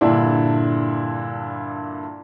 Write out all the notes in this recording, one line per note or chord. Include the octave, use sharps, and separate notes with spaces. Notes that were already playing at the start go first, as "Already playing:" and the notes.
G2 A#2 D3 D4 E4